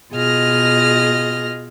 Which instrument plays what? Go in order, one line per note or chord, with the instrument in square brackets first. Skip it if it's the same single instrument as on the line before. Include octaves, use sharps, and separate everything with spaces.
[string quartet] B2 F4 G#4 D#5 F6 A#6